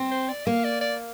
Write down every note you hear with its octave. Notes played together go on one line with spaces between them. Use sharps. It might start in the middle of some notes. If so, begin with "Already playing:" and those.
Already playing: C4
C5
D5
A#3 F5
D5
D5